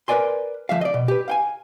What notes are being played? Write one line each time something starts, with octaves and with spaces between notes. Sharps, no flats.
A#4 B4 C#5 D5 G#5 C6
D2 F3 F#3 E5 F5
D5 D#5
B2
G4 B4
F5 G5 G#5